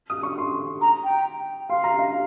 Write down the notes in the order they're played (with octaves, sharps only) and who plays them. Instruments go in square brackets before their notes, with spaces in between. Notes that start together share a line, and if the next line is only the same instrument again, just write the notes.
[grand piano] D#6
C#6
C6
[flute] A#5
G5
[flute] F5 [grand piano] C6
[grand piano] A#5
F5